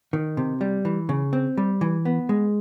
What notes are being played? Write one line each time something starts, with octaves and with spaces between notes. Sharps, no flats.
D#3
C3
G3
E3
C#3
C4
G3
E3
B3
G#3